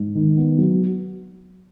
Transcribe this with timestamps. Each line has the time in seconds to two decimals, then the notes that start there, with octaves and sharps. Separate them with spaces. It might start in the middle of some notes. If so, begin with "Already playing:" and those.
Already playing: G#2
0.15 D#3
0.37 B3
0.58 F#3